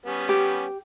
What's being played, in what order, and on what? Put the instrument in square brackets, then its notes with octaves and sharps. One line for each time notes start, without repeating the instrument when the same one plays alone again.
[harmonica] G3 B3 C#4
[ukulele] G4